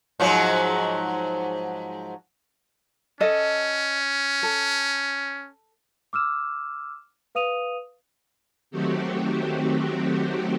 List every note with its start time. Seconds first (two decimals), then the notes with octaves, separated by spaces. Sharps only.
0.20 G#2 F3 F#3
3.21 C#4 A4 D#5
4.43 A4
6.13 D6 E6 F6 E7
7.35 B4 F5 D#6 D#7 F7
8.71 D#3 F#3 A3 C4 F#4 G4